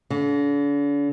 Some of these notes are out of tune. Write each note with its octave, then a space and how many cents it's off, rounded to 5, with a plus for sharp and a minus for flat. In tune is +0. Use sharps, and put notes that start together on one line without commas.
D3 -45